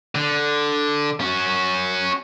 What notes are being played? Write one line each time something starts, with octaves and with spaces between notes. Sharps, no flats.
D3
C#4 F#4